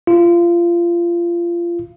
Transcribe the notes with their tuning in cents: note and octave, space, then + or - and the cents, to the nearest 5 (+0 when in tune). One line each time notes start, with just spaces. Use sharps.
F4 -25